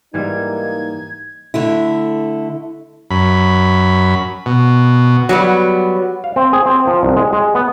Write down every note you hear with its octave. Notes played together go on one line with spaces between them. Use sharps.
G#2 E3 G3 A#3 D#4 G#6
D3 A3 E4
F#2 B5
B2
F#3 G3 B3
F5
C4
G#4
C4
F3
C2
G#3
G#3
B3